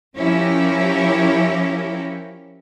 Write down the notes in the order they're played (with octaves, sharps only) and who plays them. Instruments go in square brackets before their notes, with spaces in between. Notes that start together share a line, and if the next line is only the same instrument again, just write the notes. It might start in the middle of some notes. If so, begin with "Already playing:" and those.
[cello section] F3 C#4 E4 G4 A#4